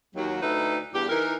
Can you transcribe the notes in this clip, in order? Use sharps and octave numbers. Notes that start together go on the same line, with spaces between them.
D#2 F#3
D2 D#4 E4 A4 B4
E2 G2 G4
E3 D#4 A#4